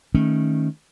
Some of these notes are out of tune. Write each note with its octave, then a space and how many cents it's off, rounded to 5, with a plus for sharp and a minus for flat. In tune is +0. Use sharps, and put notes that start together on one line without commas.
D#3 +0 A3 +0 C#4 -20